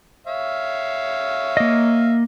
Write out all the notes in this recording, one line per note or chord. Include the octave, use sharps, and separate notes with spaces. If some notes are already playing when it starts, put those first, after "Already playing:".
C#5 E5 F5
A#3 D#5